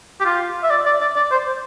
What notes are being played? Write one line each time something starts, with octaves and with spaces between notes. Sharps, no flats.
G4
F4
E5
D5
D5
D5
D5
C5